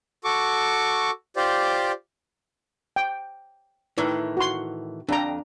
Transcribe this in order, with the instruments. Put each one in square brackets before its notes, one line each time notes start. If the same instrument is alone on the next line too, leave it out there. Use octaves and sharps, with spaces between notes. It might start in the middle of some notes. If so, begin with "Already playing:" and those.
[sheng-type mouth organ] F#4 A4 C#6 D6
F4 G4 C5 D5
[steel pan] G5
[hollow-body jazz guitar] A2 D#3 E3
[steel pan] F#4 C6
[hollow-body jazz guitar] F2 G5 [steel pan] D4 A#5